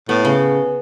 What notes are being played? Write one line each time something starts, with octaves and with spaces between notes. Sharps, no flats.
A2 B3
C#3